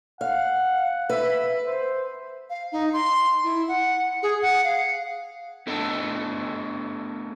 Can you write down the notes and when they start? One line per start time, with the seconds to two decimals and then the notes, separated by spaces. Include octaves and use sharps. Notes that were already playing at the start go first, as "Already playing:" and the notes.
0.21 F5 F#5
1.09 B4 E5
1.67 C5
2.50 F5
2.72 D#4
2.93 C6
3.44 E4
3.68 F#5
4.23 G#4
4.42 F#5
4.64 F5
5.67 A3 B3 D4 A4 D#5